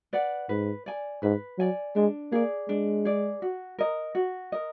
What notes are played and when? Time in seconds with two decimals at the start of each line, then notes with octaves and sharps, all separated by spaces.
0.13 B4 D5 F#5
0.49 G#2 B4
0.86 D5 G#5
1.23 G#2 B4
1.59 F#3 D5 G#5
1.96 G#3 D4
2.32 A#3 G#4 D5
2.69 G#3 D4
3.05 G#4 D5
3.42 F#4
3.79 A#4 D#5
4.15 F#4
4.52 A#4 D#5